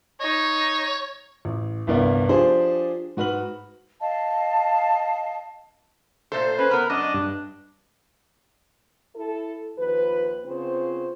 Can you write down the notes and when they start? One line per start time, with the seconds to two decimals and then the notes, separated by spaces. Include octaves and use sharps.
0.20 D#4 C#5
1.45 A1
1.87 G1 C2 G2 B3 A#4 D5
2.29 F3 D4 G4 G#4 C5
3.17 G#2 F#4 B4 F6 F#7
4.01 D#5 F5 A5
6.32 A#2 A3 A4 C5
6.59 C#4 B4
6.71 B3 A#4 B4
6.90 F#2 D4 D#5
7.14 G2
9.15 E4 A4
9.78 D#2 F3 B4
10.46 C#3 B3 C4 F4 C5